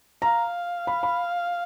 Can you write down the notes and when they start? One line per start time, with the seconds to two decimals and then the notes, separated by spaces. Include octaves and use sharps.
0.22 F5 A#5
0.87 B5
1.03 B5